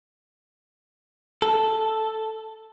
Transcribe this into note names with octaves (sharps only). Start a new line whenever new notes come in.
A4